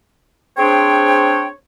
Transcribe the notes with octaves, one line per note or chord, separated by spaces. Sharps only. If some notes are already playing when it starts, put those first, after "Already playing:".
C4 D4 G#4 C5 C#5 G5